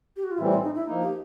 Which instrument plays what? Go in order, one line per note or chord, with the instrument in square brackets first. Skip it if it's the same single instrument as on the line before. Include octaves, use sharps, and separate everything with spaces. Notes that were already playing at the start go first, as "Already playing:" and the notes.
[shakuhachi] G4
F#4
F4
[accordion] A2 E3 G3 C4 [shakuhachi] E4
[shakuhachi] E4
D#4
E4
[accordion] F3 A#3 D#4
[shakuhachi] G4